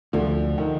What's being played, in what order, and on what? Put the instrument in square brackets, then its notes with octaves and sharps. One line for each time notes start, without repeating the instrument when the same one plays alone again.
[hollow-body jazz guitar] D2 [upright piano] D3 F3
[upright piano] D#3